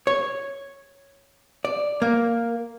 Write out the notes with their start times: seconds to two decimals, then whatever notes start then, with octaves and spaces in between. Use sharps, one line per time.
0.07 C#5
1.65 D5
2.02 A#3